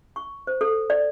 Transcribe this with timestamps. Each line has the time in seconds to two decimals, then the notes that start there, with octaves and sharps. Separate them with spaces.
0.16 C#6
0.47 C5
0.61 A4
0.90 D5